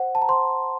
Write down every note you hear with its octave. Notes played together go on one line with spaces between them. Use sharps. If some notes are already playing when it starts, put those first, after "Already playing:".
Already playing: C5 F#5
A5
A#5
C5 C6